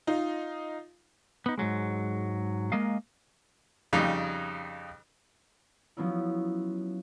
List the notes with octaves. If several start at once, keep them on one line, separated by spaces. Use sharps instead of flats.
D#4 F4
B3 D#4
G#2 B2 F#3 G#3
G#3 A#3 A#4 D#5 F5
F2 C#3 G3 D#4
F3 F#3 B3 C#4 E4